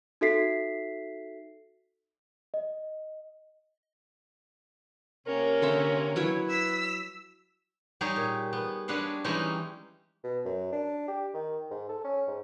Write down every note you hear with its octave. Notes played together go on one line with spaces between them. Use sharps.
D#4 F#4 A4 E5 B6 C7
D#5
C3 A#3 C#4 A#4
D3 C5 E5
F#3 E4 B4 C#5
E6 B6
G3 D#4 G4 G#4 C#5
A#2
B3
G3 G#3 D4 B4 C#5 F5
E3 G3 G#3 C#4 D#4 G4
B2
F#2
D4
G4
D#3
G#2
A4
C#4
G#2